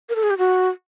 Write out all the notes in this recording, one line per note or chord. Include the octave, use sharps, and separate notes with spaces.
A#4
A4
G#4
G4
F#4